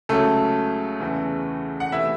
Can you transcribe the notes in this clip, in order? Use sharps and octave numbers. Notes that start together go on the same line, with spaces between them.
C#2 C#3 F#3 A3 A4
E2 C#3 E3
F#5
C3 E3 A3 E4 E5